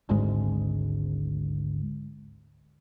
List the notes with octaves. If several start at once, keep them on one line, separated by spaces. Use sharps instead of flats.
G#1 D2 G#2 G#3